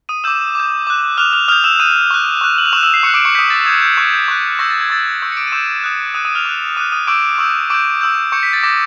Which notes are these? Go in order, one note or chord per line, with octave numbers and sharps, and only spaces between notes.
D#6 D#7
D6 E6 G6 E7
D6 G6
D6 F#6
D6 F6 F#6 F7
F6 F7
D#6 F6 G6 F7
E6 E7
D#6 G6 D#7
C#6 F#6
C#6 F#6
F#7
F7
C#6 E6 F#6 E7
E6 E7
C7
C#6 F#6 C#7
D6 D7
C#6 C#7
D#6 G6 B6
A6
D#6 G6 G#6
G6
C#6 F#6 G#6
G6
C#6 F#6
C#6 E6 G6 A#6
A6
G#6
C#6 E6 G6 A6
C#6 E6 G6
C#7
D6 D7
D#7
C#6 E6 G6 E7
D#6 F#6
D#6 F#6 D#7
D#6 D#7
F6 F7
D6 F#6
D6 D#6 F#6 D#7
D#6 D#7
C#6 D6 E6 G6 D7
C#6 E6 G6
C#6 D6 E6 G6 D7
C#6 E6 G6
C#6 D6 G6 C#7
B6
A6
D6 G6 A#6